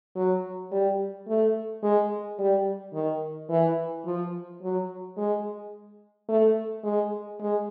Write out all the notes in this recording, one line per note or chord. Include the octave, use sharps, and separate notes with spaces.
F#3
G3
A3
G#3
G3
D#3
E3
F3
F#3
G#3
A3
G#3
G#3